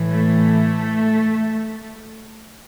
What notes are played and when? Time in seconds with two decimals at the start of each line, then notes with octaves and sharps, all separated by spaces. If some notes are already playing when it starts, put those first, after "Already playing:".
Already playing: A2 E3
0.12 A3